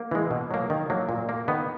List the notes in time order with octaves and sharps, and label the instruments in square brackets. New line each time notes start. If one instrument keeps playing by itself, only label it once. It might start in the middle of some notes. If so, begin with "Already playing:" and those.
Already playing: [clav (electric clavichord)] A#3
E3 G#3
B2
F#3 A#3
D#3
F#3 A#3
A#2
A#3
D#3 B3